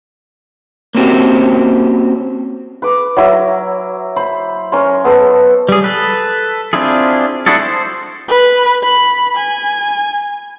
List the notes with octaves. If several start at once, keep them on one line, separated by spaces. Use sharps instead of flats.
A#3 C4 C#4 F#4 G4
B4 D6
F#3 E4 A#4
C5 B5
C#4 A#4 C6
B3 A4 C5
G3 G#4
A4 B4
C4 D4 E4 F4 G#4
D4 E4 F#4 G#4 A4
C5
B4
B5
G#5